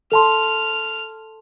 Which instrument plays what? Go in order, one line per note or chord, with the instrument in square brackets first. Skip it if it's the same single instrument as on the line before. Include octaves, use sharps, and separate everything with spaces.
[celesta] A4 A5 C6 [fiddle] F6